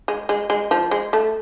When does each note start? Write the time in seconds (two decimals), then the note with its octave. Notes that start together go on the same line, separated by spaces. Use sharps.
0.08 G#3
0.29 G#3
0.50 G#3
0.71 F3
0.91 G#3
1.13 A3